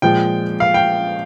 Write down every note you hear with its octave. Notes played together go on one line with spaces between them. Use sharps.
A#2 F3 G#3 G5
F5
G5